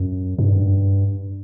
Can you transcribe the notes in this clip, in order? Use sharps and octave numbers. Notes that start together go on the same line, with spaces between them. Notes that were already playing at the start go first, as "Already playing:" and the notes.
Already playing: F#2
G2